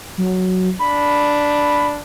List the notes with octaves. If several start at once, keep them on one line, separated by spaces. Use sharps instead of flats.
F#3
D4 B5